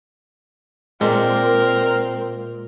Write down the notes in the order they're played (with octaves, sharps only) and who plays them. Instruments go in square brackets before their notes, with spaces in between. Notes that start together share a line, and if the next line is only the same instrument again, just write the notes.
[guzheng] A#2 [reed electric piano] G#3 [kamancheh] C4 [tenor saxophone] A#4